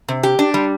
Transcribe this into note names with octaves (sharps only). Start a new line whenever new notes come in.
C3
G4
D4
G3